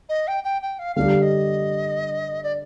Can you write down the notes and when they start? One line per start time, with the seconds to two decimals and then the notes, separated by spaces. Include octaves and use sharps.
0.09 D#5
0.28 G5
0.44 G5
0.62 G5
0.79 F5
0.96 D3 G3 D4 G4 F5
1.22 D#5
2.43 D5